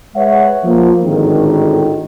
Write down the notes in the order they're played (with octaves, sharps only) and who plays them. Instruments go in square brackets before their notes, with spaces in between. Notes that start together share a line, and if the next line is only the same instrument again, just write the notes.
[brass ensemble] G#3 B4 C#5 E5 F#5
F3 A#3
G#1 A2 D3 D#3